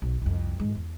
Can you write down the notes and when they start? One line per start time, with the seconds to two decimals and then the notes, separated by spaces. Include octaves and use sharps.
0.02 B1
0.22 C2 F2
0.60 G#2 G#3
0.75 E2